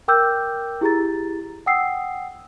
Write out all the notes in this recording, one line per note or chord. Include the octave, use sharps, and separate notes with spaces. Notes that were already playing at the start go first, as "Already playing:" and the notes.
A#4 G5 D6 E6 F6 G6
E4 G4 G#4 A#5 A6
F#5 G5 D#6 E6 C7